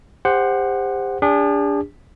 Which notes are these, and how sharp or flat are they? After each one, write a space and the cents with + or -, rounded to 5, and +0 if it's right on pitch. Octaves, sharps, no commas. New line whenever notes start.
G4 +35 C5 +0 F#5 +0
D4 -20 G#4 -45